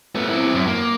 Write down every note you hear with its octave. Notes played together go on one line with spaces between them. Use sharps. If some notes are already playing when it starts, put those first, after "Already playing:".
A3 B3
C4 E4
F#2
A#3